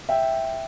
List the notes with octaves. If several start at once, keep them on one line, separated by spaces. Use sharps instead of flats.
E5 G5